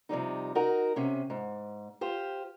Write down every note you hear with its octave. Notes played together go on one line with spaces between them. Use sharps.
C3 F3 G3 D#4
D#4 F#4 A#4
C3 C#4
G#2
F4 G4 C5